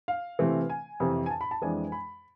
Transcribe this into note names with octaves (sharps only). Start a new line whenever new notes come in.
F5
C3 E3 A3 C4
G#5
F2 C3 E3
G#5
A5
B5
A5
F2 E3 G#3 D4 G#5
B5